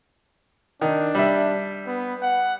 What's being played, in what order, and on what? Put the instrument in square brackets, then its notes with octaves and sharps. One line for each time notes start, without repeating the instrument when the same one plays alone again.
[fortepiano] D#3 [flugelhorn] D4
[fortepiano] G3 E5
[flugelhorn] B3
F#5